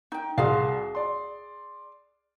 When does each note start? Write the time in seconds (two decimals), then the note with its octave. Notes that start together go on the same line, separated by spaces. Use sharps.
0.12 D#4 G5
0.38 C2 F#4 G#4 F5 C6
0.95 D5 C6